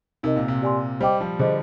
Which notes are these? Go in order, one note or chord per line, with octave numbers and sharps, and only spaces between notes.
C3 D#4 A#4 D#5
A#2
C3
G4 D5 G#5 C6
G3 C5 D#5 G5 D6
F3
D3 G#4 C5 D#5